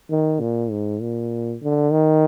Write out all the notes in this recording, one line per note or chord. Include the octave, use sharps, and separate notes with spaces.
D#3
A#2
G#2
A#2
D3
D#3